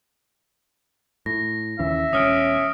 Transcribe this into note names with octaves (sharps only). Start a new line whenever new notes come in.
A2 A#6
D#2 C#3 E3 E5
E1 C#4 D#6 F6 D7